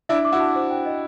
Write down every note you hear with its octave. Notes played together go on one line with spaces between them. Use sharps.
D4 E4 E5
D6
E4 F#4
A5
C5
G5
D#5